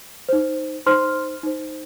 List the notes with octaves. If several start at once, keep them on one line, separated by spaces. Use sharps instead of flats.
D#4 C5
D#4 C5 C6 F6
D#4 C5